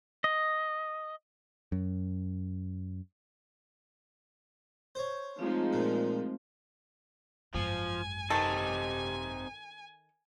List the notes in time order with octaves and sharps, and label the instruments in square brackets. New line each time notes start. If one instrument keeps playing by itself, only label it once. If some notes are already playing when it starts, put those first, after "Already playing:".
[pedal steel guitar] D#5
[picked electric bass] F#2
[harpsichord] C5 C#5
[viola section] F3 G#3 D#4 [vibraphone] A3 C4
[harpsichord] A#2
[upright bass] G#1 F#2 [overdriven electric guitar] F3 [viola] G#5
[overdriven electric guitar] C3 D#4 [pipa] D#3 A4